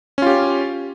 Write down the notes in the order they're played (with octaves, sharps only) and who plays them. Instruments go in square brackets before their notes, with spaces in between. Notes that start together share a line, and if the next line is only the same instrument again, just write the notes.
[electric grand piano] C#4
F4
G4